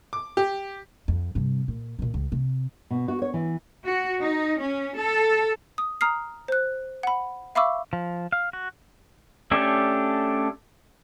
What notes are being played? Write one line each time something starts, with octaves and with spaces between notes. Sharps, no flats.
D6
G4
F2
G2 C3
A#2
A#2 D#3
C#2
C3
B2
F#4
C#5
E3
F#4
D#4
C#4
A4
D#6
A#5 D#6 F6 C7
C5 F#6
F#5 B5
E5 F5 B5 C#6 D6 E6
F3
F5
F#4
A3 C#4 D4 G4 A4